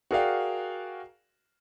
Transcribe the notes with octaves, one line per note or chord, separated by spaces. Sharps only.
F#4 G#4 A#4 D5 F5 G5